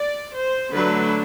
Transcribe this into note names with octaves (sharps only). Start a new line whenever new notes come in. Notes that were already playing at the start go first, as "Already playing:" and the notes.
Already playing: D5
C5
D3 F#3 A3 D4 B4